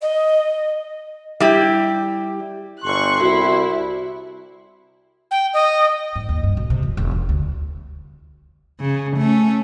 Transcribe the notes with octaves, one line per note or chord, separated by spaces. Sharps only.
D#5
G3 E4 G4
G1 C6 C#6 F#6
C2 E4 F#4
G5
D#5
G#2
D#2
G2
B1
C3
F2
E1
D#3
D2
E4
C#3
A3 C#4